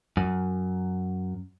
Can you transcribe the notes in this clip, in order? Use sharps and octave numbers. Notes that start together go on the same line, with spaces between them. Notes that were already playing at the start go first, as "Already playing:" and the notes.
F#2